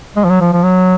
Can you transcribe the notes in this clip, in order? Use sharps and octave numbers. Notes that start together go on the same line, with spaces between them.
G#3
F3
F#3
F3
F3
F#3